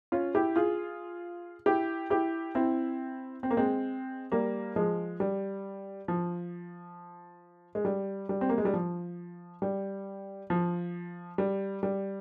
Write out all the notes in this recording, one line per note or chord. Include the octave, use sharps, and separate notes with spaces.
C#4 F4
E4 G4
F4 G#4
E4 G4
E4 G4
C4 E4
C4
A#3
G#3 C4
G3 A#3
F3 G#3
G3
F3
G#3
G3
G3
C4
A#3
G#3
G3
F3
G3
F3
G3
G3